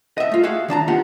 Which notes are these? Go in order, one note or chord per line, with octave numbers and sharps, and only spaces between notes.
D#5 E5
A3 F4
F#4 G#4 E5 F5
D#3 D4 A5 A#5
A#3 B3 D#4 F4 G4 F#5